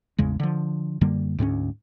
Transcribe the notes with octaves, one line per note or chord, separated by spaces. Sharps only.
A1 E2 C#3 G#3
D3 F3
F#2 D3 G3 A#3
D2 G#2 G#3 C#4